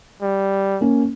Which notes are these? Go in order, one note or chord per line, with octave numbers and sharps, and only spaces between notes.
G3
A#3 C#4